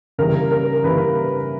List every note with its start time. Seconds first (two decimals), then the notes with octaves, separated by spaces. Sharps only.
0.18 C#3 E3 G3 A#3 A#4
0.51 A#4
0.84 C#3 E3 G3 A#3 B4